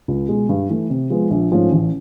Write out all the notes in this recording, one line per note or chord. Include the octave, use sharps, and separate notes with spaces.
C#2
B2 G#3
G2
E3 A3
C3
F3 G#3 B3
A#1
G#2 F3 A3 C#4
A1